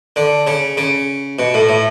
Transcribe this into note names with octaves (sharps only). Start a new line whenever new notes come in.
D3
C#3
C#3
B2
A2
A2